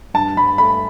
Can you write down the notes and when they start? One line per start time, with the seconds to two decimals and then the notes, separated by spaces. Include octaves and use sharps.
0.14 G2 A5
0.37 G2 B5
0.58 A3 B5